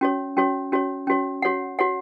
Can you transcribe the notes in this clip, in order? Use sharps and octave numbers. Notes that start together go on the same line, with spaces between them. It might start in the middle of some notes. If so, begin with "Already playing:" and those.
C#4 F#4 C#5
C#4 F#4 C#5
C#4 F#4 C#5
C#4 F#4 C#5
F#4 C#5 F#5
F#4 C#5 F#5